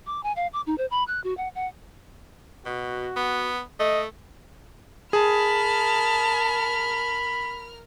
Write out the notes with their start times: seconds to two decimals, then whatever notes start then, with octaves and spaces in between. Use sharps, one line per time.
0.06 D6
0.23 G#5
0.36 F5
0.53 D6
0.66 D#4
0.78 C5
0.91 B5
1.07 F#6
1.24 F#4
1.37 F#5
1.55 F#5
2.66 B2 F#4
3.16 B3
3.80 A3 D#5
5.13 G#4 A#4 A5 B5 F6